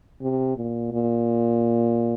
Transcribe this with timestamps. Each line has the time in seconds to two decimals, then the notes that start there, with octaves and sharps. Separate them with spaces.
0.22 C3
0.57 A#2
0.92 A#2